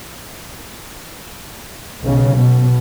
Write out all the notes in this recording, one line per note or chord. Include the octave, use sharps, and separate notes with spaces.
B1 C#3
B2